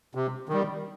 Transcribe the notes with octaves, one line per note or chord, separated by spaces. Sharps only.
C3
D#3 G3